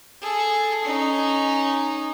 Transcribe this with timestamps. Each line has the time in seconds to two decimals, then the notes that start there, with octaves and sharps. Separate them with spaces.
0.21 G#4 A4
0.84 C#4 D#4